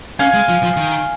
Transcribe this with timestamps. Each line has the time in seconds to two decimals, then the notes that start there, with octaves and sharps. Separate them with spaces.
0.19 C#4 F5 G#5
0.34 G#3
0.48 F3
0.63 F3
0.77 D#3